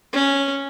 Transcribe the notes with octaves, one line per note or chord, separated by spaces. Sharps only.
C#4